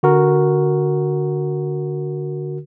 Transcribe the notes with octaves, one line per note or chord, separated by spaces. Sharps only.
D3 F#4 A#4